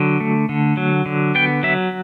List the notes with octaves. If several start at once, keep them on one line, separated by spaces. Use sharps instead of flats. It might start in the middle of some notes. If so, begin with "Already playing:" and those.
Already playing: D3 F#3
A3
D3
F#3
D3
B3 G5
F#3 E5